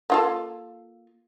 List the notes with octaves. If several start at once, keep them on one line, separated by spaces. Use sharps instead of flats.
A#3 F4 A4